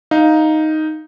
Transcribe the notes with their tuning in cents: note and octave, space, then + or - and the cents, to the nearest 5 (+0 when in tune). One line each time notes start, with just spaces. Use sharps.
D#4 +0 F5 +0